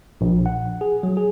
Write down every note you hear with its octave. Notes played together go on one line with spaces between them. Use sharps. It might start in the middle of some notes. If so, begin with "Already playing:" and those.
A#1
F#5
G#4
F#3
G#4